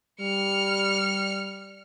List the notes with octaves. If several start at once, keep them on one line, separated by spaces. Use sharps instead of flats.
G3 F6 C#7